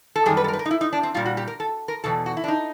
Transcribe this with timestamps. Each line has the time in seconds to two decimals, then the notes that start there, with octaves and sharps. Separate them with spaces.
0.16 A4
0.26 F#2 D#3 G3 G#4
0.37 B4
0.44 A4
0.48 A#4
0.53 B4
0.59 A#4
0.66 D#4
0.71 E4
0.81 D#4
0.93 D4
1.03 C4
1.14 A#2 G3 F4
1.26 F#4
1.37 G4
1.47 A#4
1.60 A4
1.88 A#4
2.04 E2 B2 A4
2.26 F#4
2.37 E4
2.44 D4
2.48 D#4